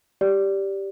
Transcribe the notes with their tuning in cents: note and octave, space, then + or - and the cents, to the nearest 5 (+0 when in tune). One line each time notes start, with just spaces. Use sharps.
G4 +0 D5 -10